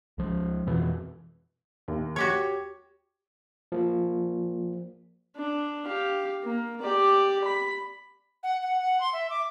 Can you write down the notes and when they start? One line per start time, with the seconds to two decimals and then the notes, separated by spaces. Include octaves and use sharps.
0.18 C#2 F3
0.67 F2 B2 E3
1.88 D#2
2.16 F#4 G4 C#5 G#6
3.72 F3 A#3
5.36 D4
5.85 G4 F5
6.44 A#3
6.81 G4 D5
7.44 B5
8.43 F#5
8.62 F#5
8.80 F#5
9.00 C6
9.13 E5
9.30 D6